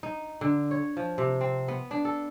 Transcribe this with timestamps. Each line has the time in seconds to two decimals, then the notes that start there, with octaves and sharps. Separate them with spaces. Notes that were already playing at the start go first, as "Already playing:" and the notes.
0.03 D#4
0.41 D3
0.71 C#5
0.97 F3
1.18 C3
1.41 C4
1.68 B3
1.91 D4
2.05 A4